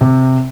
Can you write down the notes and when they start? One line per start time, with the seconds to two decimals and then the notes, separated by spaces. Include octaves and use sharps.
0.01 C3